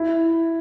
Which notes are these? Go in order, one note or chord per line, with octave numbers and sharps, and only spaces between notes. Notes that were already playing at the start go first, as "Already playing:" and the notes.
Already playing: E4